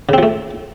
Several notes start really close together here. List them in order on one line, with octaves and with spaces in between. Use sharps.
C#3 C4 F3 A3